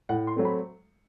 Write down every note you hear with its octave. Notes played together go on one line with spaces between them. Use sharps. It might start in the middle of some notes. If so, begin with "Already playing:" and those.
A2 F#5
C6
F#3 A3 C4
B5